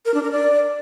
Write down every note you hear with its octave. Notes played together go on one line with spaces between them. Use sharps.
A#4
D4
A#4
D5